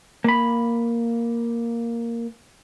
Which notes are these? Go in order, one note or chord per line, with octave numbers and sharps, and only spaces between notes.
A#3 B5